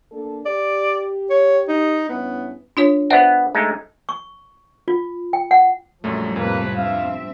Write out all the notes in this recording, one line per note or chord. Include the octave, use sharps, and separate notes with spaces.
A#3 D4 A4
G4 D5
C#5
D#4
G2 B3 C#4 E4
D4 F4 C#5
B3 C5 D5 E5 F#5
G#3 A3 D#4
C#6
F4
G5
F#5
A#1 F#2 F3 G3 A3
F2 A2 C3 A#3 B4
G2 C4 E5 F5